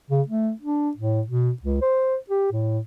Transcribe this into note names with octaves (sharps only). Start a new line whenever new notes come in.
C#3
A3
D4
A2
B2
C#2
C5
G4
A2